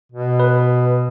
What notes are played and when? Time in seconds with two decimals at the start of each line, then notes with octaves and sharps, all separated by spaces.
0.12 B2
0.40 B4